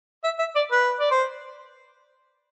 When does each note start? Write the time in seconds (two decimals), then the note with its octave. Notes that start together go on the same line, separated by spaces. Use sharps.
0.24 E5
0.39 E5
0.56 D5
0.71 B4
1.00 D5
1.11 C5